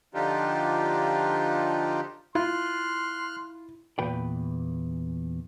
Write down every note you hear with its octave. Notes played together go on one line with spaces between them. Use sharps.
D3 F3 D4 D#4 F4 G4
E4 F4 C6 F6 F#6
E2 A#2 B4 G5